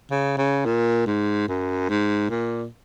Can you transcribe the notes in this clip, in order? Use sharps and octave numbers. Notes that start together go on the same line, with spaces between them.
C#3
C#3
A#2
G#2
F#2
G#2
A#2